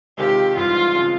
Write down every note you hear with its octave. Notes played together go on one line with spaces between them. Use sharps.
C3 D#3 G#3 C4 F4 G4
G#2 E3 G3 F4
C#3 F3 G#3 C4